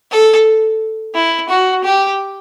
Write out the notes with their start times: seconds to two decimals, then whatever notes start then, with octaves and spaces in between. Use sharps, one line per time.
0.11 A4
1.15 E4
1.49 F#4
1.84 G4